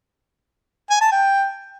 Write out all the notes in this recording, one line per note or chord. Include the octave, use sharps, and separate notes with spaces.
G#5
A5
G5